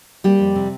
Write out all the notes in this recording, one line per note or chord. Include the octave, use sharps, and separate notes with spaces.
G3 A#3 G4
F2
C3